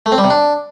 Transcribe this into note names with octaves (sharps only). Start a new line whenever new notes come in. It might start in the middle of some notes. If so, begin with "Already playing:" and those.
A3
C4
G3
C3
D4